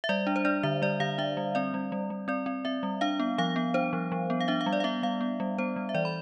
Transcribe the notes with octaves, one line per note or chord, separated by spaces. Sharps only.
E5
G3 D5
D4
C5
D4 D5
D3 E5
G3 D5
D3 F5
D4 E5
G3
C4 D5
G3
G3
G3
C4 D5
C4
C4 E5
G3
D4 F5
B3
F3 F5
B3
D4 C5
F3
F3
B3
F5
D4 E5
F5
G3
D5
F5
B3 E5
G3 F5
B3
G3
B3 C5
G3
E5
E3 D5
B5